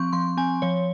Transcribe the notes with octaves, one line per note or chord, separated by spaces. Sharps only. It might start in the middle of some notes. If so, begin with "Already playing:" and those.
Already playing: F3 C4 C#6
F3 C6
C4 G#5
F3 C#5